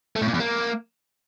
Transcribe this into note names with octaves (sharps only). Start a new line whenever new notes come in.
A3
A2
A#2
E2
A#3